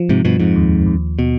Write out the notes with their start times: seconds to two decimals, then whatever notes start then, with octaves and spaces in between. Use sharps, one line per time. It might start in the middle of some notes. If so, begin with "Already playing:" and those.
Already playing: F3
0.09 G#2 C3
0.25 G2 B2 F3
0.40 F2 G#2
0.56 D#2
0.86 D#2
1.19 B2